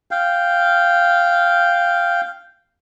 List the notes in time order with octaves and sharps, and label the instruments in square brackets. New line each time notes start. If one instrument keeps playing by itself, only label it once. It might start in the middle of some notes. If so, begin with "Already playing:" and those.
[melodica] F5 G5